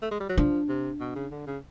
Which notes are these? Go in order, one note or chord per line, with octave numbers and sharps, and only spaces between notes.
A3
G#3
G3
F#3
F3 D4
C3
B2
C#3
D3
C#3